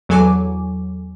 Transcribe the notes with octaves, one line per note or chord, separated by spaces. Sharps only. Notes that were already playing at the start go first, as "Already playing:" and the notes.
E2 F#3 A4 G#5 C#6 D6